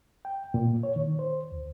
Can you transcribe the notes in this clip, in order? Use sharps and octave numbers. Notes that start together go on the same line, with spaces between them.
G5
A#2
C#5
D#3
C5
D2